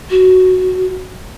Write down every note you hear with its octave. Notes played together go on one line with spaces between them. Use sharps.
F#4